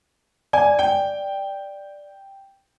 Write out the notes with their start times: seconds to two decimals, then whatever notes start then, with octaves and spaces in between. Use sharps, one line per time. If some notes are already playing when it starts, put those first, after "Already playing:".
0.53 D5 G#5
0.79 G5